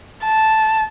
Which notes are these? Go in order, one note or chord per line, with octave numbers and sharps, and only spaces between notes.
A5